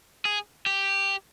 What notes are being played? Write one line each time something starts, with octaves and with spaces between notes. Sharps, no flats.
G#4
G4